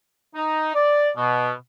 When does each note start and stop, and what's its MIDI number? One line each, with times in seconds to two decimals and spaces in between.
0.35 0.73 63
0.74 1.09 74
1.17 1.52 47